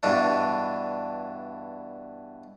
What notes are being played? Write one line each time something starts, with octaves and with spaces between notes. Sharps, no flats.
G2 B2 E3 D4